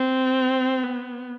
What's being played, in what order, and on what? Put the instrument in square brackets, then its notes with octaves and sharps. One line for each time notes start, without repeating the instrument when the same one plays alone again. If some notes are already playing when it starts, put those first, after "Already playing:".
Already playing: [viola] C4
B3